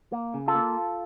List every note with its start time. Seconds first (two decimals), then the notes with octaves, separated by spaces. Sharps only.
0.12 A#3
0.34 C#3
0.48 F4 A4
0.55 A#3